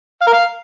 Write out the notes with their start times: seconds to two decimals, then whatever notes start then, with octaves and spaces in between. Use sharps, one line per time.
0.21 F5
0.27 A#4
0.33 F5